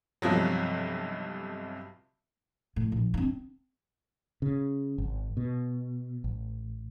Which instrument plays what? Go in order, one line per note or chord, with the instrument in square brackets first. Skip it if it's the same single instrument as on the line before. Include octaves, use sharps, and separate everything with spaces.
[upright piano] B1 G2 C3 F3 F#3
[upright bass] A2
A#1
C4 D4
[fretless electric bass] C#3
G#1
B2
A1